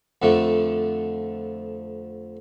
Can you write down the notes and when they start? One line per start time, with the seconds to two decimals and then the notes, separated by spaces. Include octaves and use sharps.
0.22 F2 D3 A3